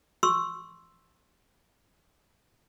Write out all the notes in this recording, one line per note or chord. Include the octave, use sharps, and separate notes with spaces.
C6 C#6 E6